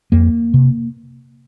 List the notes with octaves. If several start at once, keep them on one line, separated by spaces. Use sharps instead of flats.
F2 A#3
C3